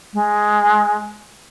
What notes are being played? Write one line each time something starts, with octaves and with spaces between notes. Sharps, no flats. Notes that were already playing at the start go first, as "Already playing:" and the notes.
G#3